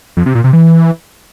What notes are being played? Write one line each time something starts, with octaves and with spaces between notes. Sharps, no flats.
F2
C3
A#2
C3
E3